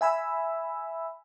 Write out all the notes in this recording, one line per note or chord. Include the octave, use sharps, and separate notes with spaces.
E5 G#5 B5 E6